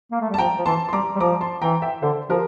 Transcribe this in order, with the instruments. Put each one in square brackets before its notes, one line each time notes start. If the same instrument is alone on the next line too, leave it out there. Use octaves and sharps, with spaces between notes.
[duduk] A#3
A3
G3
[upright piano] A5
[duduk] F3 [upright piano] G5 A#5
[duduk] F3
[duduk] E3 [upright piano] A5 C6
[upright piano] C6
[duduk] G3 [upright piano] A#5 D6
[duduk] G3
[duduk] F3 [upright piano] A#5 D6
[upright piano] A5 C6
[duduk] E3 [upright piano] G5 A#5
[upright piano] E5 G5
[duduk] D3 [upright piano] A4 C5
[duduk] F3 [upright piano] G4 A#4